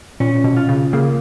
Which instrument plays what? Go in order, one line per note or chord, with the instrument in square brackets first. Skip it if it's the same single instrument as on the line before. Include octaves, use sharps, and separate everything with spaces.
[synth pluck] A#2 [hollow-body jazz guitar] C#4
[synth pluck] B2
[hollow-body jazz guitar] F4
[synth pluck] C#3
[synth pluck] C#3 [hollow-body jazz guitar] A#3